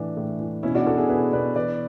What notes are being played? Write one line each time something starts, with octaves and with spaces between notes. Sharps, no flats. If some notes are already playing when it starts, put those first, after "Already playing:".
Already playing: A2 E3 D4
A2
E3
B2 C#4 E4
D4 F#4
B2 F#4 A4
E4 G#4
B2 G#4 B4
B2 B4 D5
E3 B4 D5